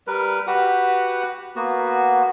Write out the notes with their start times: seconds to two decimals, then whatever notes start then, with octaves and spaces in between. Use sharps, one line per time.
0.07 G3 A#4 B4
0.47 F#4 G4 B4 F#5
1.56 A#3 B3 F#4